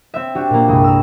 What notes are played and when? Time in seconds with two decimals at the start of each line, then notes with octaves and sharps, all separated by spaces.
0.14 C4 E5
0.35 D4 F#4 G4
0.50 A#2 A#3
0.68 C2 G2 G#3 D#5
0.84 A#4 E6